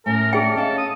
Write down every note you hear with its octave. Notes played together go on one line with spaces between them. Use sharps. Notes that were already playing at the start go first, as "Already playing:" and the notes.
A2 A3 C#4 A#4 G#5
G#4 C#5 D5 G5 A5 B5
C#4 A4 D#5 F5
D#6